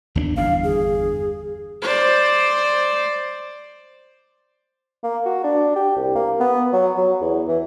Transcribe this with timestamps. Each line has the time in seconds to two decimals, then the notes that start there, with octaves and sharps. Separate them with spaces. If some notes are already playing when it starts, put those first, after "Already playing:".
0.15 D#2 B3 D4
0.37 G1 E2 D4 F5
0.64 G#4
1.82 C5 D5
5.03 A#3
5.25 F#4
5.44 D4
5.76 G4
5.96 C2
6.15 A#3
6.40 B3
6.73 F#3
6.97 F#3
7.21 E2
7.48 E3